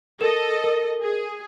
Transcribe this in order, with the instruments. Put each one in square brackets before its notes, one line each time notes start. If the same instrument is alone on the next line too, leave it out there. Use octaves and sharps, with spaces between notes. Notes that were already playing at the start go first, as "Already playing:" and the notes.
[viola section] A4 D#5 [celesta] A#4 E7
[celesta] A#4
[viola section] G#4